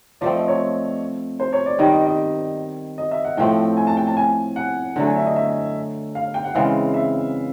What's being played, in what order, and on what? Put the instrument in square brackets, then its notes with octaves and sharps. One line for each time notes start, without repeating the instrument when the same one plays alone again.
[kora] F3 A3 C4 [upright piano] D5
[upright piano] D#5
C#5
C5
C#5
D5
[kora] D#3 G3 C4 [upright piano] D#5
[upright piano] D#5
D#5
D#5
E5
F#5
[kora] A2 F3 A3 C4 [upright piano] G5
[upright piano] G#5
A5
G5
A5
G#5
F#5
[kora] D3 F#3 A3
[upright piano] G#5
E5
D#5
E5
F5
G5
F#5
[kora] C#3 E3 G#3 C4 [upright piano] F5
[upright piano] E5